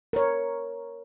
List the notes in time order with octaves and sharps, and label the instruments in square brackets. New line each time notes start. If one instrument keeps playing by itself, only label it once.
[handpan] A#4 C#5